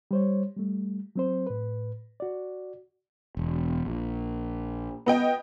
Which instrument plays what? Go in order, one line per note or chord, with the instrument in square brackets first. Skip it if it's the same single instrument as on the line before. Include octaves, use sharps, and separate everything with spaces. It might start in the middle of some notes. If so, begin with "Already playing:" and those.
[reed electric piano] G3 C5 C#5
G3 A3
F#3 C4 C5
A2 B4
F#4 D5
[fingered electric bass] E1
A#1
[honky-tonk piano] B3 D#5 G5